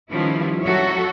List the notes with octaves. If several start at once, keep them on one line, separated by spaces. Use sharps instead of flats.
D#3 F3 G3 B3 C#4 E4
F#3 F#4 A4 C#5 E5